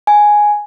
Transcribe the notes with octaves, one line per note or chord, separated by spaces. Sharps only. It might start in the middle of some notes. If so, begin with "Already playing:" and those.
G#5